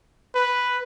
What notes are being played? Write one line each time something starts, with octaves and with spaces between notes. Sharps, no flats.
B4